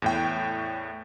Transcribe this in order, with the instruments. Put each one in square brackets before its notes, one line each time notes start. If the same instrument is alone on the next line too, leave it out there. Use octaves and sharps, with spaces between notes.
[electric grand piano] E2 A2 G5